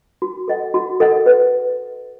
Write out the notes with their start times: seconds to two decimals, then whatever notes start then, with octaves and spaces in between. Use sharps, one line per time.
0.22 F#4
0.48 A4 D#5 F#5
0.74 F#4
1.00 A4 D#5 F#5
1.26 B4